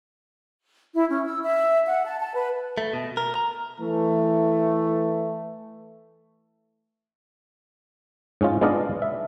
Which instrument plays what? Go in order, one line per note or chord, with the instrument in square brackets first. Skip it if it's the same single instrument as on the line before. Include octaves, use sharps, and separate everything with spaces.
[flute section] E4
C#4
E6
E5
F#5
A5
A5
B4
[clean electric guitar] A3
B2
A#4
A#5
[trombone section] E3 A3
[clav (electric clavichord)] G#2 C#4 F4
G#3 B3 D4 D5 D#5 F5
E5